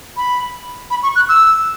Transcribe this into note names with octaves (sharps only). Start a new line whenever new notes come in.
B5
B5
C#6
F#6
E6